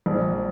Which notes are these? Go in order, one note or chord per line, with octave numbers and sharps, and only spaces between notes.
A#1